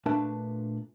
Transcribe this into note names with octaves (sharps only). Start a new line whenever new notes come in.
A#2 A3 D4 B4 A5